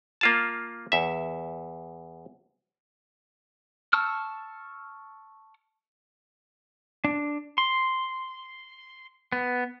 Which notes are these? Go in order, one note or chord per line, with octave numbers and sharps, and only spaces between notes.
A#3 F4 A5
E2 E5
A5 C#6 E6 F6
D4
C6
B3